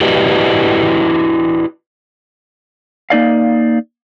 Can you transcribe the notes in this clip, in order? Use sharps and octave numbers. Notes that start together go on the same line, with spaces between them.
E4 F#4 G4 B4 D5 D#5
A#3 D#4 D5 F5